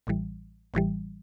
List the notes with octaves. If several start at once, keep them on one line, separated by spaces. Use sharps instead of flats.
A1 A2 E3 G3
A1 A2 E3 G3